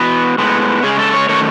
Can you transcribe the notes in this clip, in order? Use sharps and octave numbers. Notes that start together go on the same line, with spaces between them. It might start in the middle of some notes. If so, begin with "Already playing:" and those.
Already playing: E3 B3 F#4
A2 G#3 B3
C#3 G#3 C#4 G#4
A4
C#5
D#3 F#3 A3 C#4 C#5